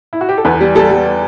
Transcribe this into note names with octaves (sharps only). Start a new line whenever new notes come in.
E4
F#4
G4
A4
E2 B4
G3
G3 A4
G3